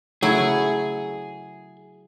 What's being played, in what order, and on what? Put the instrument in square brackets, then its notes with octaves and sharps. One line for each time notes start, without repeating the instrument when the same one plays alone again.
[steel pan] C#3 A3 C#5 [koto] F#3 E4 G#5 [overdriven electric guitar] G#4